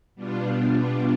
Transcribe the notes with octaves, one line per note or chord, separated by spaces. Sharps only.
B2 G3 B3 D4 F4